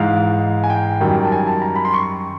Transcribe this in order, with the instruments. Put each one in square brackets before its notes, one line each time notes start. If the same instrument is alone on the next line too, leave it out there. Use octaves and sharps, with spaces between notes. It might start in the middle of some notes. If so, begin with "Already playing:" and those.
Already playing: [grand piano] G#2 E3 G#3 F5
G#5
G5
F#2 D#3 G3
A5
G#5
A5
A#5
B5
C6
C#6